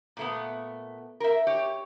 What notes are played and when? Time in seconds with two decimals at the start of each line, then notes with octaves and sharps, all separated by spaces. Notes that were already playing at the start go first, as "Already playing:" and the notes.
0.17 A#2 A3 B3
1.20 A#4 E5
1.47 G4 C#5